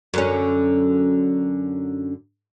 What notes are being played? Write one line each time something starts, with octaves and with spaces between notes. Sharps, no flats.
F#2 D3 C#4